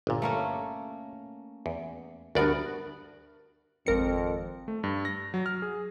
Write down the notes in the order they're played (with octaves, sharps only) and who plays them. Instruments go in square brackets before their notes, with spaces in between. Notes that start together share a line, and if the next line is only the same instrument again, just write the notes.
[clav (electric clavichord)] G1 A#2
[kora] A3 A#3 C#4
[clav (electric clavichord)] E2
[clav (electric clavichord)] D2 D5 [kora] G2 B3 F#4 [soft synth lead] A#4
[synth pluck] G#1 A#4 C#7 [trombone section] F2
[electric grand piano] A3
G2
A#6
F#3
F6
G#4